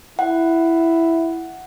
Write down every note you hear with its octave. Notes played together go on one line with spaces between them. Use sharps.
E4 F#5